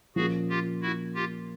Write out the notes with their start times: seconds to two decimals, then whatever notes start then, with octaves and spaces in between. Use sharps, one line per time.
0.16 A#2 F3 A#3 C#4 F#4 G#4
0.49 F4 G4
0.82 E4 F#4
1.15 F4 G4